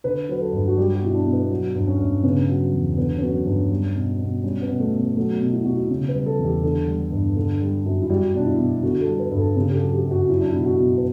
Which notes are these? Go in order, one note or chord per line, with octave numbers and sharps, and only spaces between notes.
D3 B4
F#3 B4
A4
G2
F#4
G3 G4
F#4
B2 E4
D4
B2
B3
F#3
G2
C#4
G2
C#3 B3
F#3
E2
D3 B3
C#4
F#3 B3
G2 C#4
G3
B2
B2
G3 C#4
B3
B2
A3
B2
B3
F#3 A3
B2
E4
B2 F#4
E4
C#3
B4
G3
A4
E2
G4
D3 A4
G3
G2
D3
G3
F#2
E4
G3 F#4
B2 D4
E4
B2
D3 F#4
A4
G3
B4
G2
A4
C#3 G4
G4
A4
F#3
G4
F#2
F#4
F#3 E4
D4
B2 E4
F#4
B2
B4